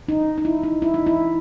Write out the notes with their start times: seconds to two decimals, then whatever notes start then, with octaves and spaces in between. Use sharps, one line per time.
0.08 D#4
0.38 D#4
0.45 E4
0.63 D#4
0.82 E4
0.94 D#4
1.06 E4